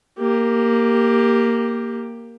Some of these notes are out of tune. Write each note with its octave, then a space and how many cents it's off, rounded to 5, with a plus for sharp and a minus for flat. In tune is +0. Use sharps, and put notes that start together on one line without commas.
A#3 +0 G4 +10